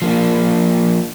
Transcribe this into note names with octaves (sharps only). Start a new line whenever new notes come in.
F3 A#3 D4